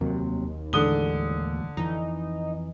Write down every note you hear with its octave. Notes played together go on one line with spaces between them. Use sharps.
F1 D#2 C3 F#3
A2 D3 E3 G#3 D#6 G7
F2 E3 D#4